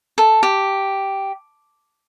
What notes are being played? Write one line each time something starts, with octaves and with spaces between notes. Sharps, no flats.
A4
G4